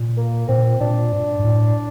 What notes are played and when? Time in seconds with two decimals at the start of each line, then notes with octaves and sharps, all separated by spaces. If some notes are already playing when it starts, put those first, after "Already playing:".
Already playing: A#2
0.17 A#3
0.48 A#2 C4
0.81 A#2 D4
1.12 G2
1.39 G2
1.44 A2